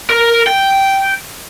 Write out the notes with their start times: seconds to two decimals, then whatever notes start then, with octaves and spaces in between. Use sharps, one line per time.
0.10 A#4
0.47 G5